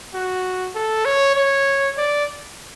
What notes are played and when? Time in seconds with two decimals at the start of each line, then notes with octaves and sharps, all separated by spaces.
0.14 F#4
0.75 A4
1.05 C#5
1.36 C#5
1.97 D5